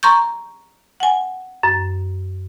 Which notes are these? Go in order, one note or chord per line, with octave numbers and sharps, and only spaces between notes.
A#5 C6 C#6 G6
F#5 G#5
F#2